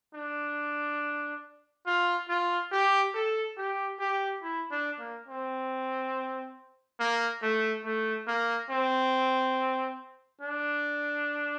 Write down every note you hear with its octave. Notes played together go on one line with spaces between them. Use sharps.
D4
F4
F4
G4
A4
G4
G4
E4
D4
A#3
C4
A#3
A3
A3
A#3
C4
D4